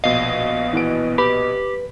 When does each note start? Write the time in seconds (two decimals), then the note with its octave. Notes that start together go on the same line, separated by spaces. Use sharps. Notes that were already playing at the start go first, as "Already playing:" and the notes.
0.04 A#1 B2 D#5 F5
0.73 E3 B3 D7
1.18 G4 B4 B5